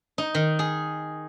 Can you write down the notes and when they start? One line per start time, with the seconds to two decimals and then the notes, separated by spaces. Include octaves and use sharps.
0.18 D#4
0.35 D#3
0.59 G#4